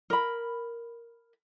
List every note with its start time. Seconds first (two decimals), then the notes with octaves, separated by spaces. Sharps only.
0.10 A#4 B5